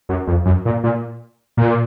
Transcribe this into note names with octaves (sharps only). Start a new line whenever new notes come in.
F#2
F2
F#2
A#2
A#2
A#2